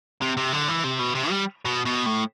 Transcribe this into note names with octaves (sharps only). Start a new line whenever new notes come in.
C3
C3
D3
E3
C3
B2
C3
G3
B2
B2
A2